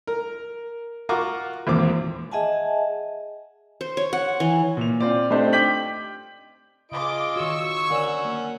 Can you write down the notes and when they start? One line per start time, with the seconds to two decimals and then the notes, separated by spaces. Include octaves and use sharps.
0.07 A#4
1.09 F4 F#4 A#4 A#5 C#6 D6
1.67 G#1 E2 A#2 C4 D6
2.32 G#4 D#5 E5 F#5 G#5 A5
3.81 C5
3.97 C#5
4.13 F#5
4.40 E3
4.77 A#2 F7
5.00 C4 F4 C5 D5
5.30 A3 C4 D4 D#4 G4 C5
5.53 G5 D6 G6 B6 F#7
6.92 C#3 F4 G#4 D#5 D6 D7
7.36 D#3 F#4 C#5 C#6 E6
7.90 D3 C#4 A#4 D5 F#5
8.25 A#3